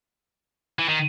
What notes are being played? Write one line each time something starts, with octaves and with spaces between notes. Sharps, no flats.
E3
D#3